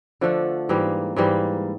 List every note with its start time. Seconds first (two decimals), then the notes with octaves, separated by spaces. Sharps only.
0.21 D3 F3 A3 D4
0.69 G#2 E3 G3 A#3
1.16 G#2 E3 G3 A#3